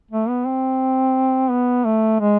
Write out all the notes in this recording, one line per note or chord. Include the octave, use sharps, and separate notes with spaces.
A3
B3
C4
B3
A3
G#3